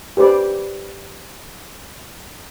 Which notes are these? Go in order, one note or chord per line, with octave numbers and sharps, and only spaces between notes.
G4 B4 C5 D5